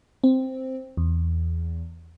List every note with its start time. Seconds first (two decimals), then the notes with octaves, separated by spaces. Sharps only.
0.24 C4
0.97 E2